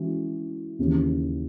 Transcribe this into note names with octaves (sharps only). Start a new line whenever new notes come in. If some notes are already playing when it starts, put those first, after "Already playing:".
Already playing: E3 G#3 C#4 F#4
D#2 C#3 E3